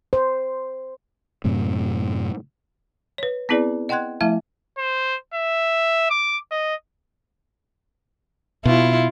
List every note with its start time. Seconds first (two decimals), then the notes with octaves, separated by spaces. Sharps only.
0.13 C5
1.44 F#2 A2 C3
3.18 B4 C#5
3.49 B3 C4 E4 G#4 B4 D5
3.89 D#5 F#5 G5 C6 F#6 G#6
4.21 F3 A3 E4 E5 F5 A5
4.78 C5
5.34 E5
6.10 D6
6.51 D#5
8.65 B2 E4 F4